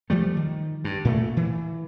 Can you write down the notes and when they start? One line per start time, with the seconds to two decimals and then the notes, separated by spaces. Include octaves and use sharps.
0.10 F3 G3 A3
0.37 D#3
0.84 G2
1.05 A#2 A3
1.37 E3